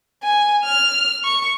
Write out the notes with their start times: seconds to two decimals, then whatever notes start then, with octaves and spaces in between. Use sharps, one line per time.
0.23 G#5
0.64 F6
1.24 C#6